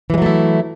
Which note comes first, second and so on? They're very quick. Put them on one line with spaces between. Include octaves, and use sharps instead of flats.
E3 G#3 F#3 A3 E4